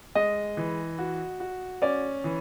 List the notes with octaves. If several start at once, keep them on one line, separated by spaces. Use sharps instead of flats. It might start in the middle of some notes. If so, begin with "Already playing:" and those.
G#3 D#5
E3
F#4
F#4
C#4 D5
E3